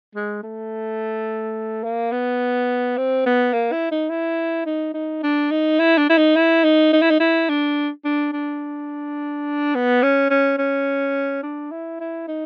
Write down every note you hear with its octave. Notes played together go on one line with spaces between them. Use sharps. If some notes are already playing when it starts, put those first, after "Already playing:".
G#3
A3
A#3
B3
C4
B3
A#3
E4
D#4
E4
D#4
D#4
D4
D#4
E4
D4
E4
D#4
E4
D#4
D#4
E4
D#4
E4
D4
D4
D4
B3
C#4
C#4
C#4
D4
E4
E4
D#4